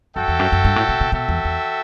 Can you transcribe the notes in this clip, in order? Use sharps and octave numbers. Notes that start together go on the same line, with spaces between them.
F#2 F#4 A4 E5 G5
E2
F#2
F#2
G2
A2
B2
B2
B2 F#4 A4 E5 G5
E2
E2